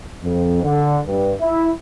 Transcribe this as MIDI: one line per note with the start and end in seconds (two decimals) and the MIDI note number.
0.25 0.63 41
0.63 0.99 50
1.07 1.34 43
1.41 1.70 64